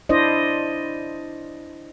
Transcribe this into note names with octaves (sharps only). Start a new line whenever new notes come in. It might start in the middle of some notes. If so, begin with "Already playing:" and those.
D4 E4 C5 D5 D#5